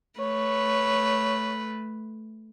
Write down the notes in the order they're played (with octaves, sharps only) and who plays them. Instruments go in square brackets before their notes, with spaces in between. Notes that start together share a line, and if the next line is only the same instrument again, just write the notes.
[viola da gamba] A3 B4 [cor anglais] C#5